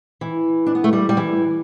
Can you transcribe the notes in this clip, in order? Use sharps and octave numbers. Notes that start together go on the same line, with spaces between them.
E3
D4
B3
A3
G3
G3
E3